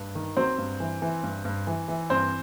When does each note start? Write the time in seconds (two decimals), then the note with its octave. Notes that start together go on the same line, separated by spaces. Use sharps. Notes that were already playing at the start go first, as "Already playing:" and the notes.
Already playing: G2
0.15 D#3
0.37 F#3 C4 C5
0.58 G2
0.80 E3
1.02 E3
1.23 G2
1.45 G2
1.67 E3
1.88 E3
2.10 G2 C4 C5